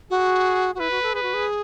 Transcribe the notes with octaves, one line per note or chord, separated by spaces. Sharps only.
F#4 G#4
F#4
E4 B4
F#4
A4
G#4 B4
F#4
G#4